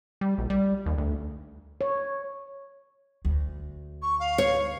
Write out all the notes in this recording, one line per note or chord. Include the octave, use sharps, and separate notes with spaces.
G3
A#1
G3
D#2
D2
C#5
D2
C#6
F5
C#5